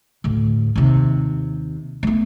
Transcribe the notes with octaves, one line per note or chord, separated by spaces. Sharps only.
D2 A2
D#2 C3
A3 B3